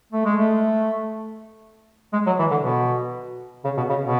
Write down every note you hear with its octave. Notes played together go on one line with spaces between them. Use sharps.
A3
G#3
A3
G#3
F#3
E3
D3
B2
C#3
B2
C#3
B2